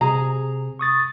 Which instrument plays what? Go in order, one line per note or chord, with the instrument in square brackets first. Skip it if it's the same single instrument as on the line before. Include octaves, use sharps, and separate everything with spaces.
[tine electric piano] C3 [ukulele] G#4 A#5
[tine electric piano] C#6 D#6 A6